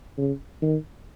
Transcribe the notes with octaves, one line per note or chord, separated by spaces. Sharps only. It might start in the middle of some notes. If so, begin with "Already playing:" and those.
C#3
D#3